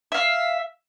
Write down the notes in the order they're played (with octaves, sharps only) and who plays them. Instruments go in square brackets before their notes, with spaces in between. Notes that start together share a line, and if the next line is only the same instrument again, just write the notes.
[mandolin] E5 F5